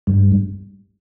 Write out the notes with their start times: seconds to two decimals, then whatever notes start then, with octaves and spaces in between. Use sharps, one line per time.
0.07 G2